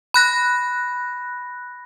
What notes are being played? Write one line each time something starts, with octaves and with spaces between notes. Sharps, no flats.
B5 F#6 A#6